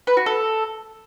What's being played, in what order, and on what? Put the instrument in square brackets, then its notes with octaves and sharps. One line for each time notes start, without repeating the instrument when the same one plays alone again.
[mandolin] B4
F#4
A4